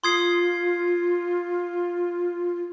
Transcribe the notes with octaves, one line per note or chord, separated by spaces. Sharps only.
F4 C6 D#6 G#6 C7